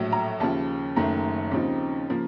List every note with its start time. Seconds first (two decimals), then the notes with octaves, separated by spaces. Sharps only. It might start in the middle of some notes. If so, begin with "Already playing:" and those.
Already playing: A#1 A2 F#3
0.12 A#5
0.40 D#2 C#3 F3 A5
0.96 F#1 F#2 D#3 A3 A#5
1.51 D#2 C#3 F3 C4 D#4
2.08 C#3 F3 A#3